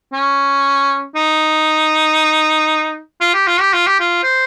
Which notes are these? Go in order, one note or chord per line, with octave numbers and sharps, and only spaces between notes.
C#4
D#4
F4
G4
F4
G4
F4
G4
F4
C5